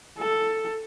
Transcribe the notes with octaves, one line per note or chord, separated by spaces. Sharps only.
A4